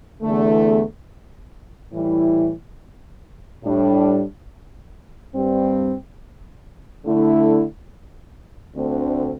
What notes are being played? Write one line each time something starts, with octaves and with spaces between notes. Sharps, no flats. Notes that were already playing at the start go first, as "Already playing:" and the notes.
E2 D3 A3
A2 E3 G3 E4
A2 G3 D4
G2 G3 C4
D3 A3 E4
D2 D3 A3 C4